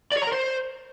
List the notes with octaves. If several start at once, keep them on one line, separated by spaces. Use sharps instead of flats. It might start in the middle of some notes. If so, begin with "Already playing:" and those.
D5
C#5
A#5
A#4
C5